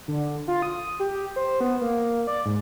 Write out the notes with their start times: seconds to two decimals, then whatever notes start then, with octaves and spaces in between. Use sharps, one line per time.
0.08 D3
0.48 F4
0.62 D#6
1.00 G4
1.36 C5
1.61 B3
1.81 A#3
2.27 D5
2.46 G#2